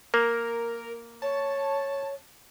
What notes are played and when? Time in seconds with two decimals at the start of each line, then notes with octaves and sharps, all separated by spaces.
0.14 A#3 A#4
1.22 C#5 A5